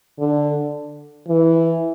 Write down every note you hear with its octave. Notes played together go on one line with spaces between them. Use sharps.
D3
E3